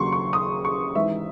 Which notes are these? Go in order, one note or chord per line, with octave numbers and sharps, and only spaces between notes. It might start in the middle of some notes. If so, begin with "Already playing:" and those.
Already playing: D#2 C#3 F#3 C6 C#6
C#6
D#6
C#6
G#1 G#2 E3 E5